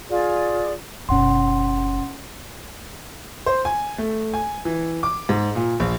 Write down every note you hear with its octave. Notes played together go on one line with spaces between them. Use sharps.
F4 G#4 D5
F#1 B2 C#4 F#5 C6
C5
G#5
A3
G#5
E3
D6
G#2
A#2
A#1